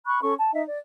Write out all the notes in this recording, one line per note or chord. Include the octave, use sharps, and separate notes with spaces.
B5 C#6 F#6
C#4 A4 C#6
A5
D#4 D#5 E5
D5